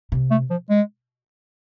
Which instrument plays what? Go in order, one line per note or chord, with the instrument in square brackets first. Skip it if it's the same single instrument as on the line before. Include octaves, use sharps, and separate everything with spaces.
[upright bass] C3
[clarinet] A3
F3
G#3